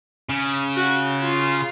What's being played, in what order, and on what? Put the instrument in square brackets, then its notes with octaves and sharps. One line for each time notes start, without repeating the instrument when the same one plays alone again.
[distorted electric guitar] C#3
[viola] F#4
F4